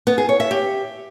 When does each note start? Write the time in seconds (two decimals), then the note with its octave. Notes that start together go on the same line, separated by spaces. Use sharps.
0.07 B3
0.18 G#4
0.29 C#5
0.40 E5
0.51 G4